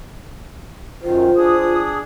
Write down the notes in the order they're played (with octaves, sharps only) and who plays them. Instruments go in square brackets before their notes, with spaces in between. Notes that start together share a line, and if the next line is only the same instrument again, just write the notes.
[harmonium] F#2 D#3 [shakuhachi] F4 [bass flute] C5
[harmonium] D4 G#4 [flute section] D#6